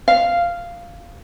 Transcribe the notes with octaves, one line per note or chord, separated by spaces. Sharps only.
F5